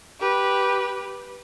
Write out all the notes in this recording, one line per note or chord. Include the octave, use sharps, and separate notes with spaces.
G4 B4